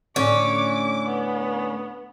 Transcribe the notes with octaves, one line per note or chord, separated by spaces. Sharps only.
A2 D3 A3 C#4 D6
B3